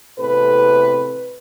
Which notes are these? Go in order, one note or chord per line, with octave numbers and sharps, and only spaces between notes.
E2 A2 C3 A4 B4